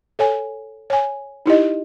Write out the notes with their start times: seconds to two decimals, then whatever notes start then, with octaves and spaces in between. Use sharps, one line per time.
0.19 A4 C#5 G#5
0.90 C#5 G#5
1.46 D#4 E4 G4 D#5